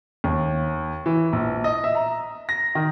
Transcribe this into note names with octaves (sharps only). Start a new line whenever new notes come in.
D#2
E3
A#1
D#5
E5
A#5
A#6
D#3